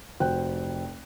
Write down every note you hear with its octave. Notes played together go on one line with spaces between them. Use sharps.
F1 F#4 C5 G5 F#6